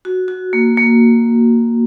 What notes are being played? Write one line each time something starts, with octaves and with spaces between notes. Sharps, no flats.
F#4
F#4
A#3
A#3